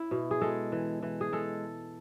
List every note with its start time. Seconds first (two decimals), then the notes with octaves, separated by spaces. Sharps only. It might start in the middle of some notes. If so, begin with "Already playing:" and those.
Already playing: E4
0.11 B2
0.31 G#4
0.41 G#3 A4
0.72 E3
1.02 E3
1.21 G#4
1.33 G#3 A4